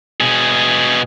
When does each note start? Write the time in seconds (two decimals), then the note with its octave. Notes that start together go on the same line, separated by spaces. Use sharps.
0.20 B2 G#4